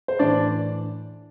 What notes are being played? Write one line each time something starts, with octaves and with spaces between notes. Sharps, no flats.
C5
A2 E3 D4 D5